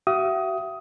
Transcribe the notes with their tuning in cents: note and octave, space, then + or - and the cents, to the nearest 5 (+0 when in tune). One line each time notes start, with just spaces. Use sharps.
F#4 +40 E5 +35 D#6 +15